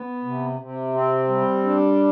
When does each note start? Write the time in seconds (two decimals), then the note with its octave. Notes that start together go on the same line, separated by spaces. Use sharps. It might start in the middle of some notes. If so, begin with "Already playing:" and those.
Already playing: B3
0.24 C3
0.59 C3
0.94 C4
1.28 G3
1.64 D4